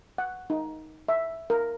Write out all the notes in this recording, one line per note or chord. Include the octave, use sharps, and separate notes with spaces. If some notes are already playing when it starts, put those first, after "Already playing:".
F#5
D#4
E5
A#4